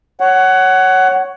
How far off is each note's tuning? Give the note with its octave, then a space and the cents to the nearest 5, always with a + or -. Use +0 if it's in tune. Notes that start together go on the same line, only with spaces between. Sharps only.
C#5 +0 F#5 +20